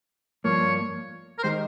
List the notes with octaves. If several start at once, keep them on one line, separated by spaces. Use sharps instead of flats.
G2 F3 A#3 C#5
A#4
D#3 G#3 D#4 G4 C5